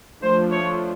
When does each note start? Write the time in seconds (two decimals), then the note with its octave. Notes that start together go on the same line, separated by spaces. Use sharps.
0.22 F3 A3 D4 F4 C5
0.52 C#5